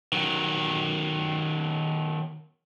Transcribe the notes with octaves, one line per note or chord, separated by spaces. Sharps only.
D#3 F#3